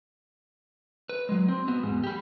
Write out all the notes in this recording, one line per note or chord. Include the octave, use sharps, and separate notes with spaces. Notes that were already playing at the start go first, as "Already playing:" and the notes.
B4
F#3 G#3
C4
B3 F#4
E2 G#2
G4 B5